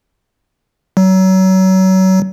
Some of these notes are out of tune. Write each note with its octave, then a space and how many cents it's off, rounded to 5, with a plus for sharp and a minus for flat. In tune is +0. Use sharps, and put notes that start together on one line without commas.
F#3 +30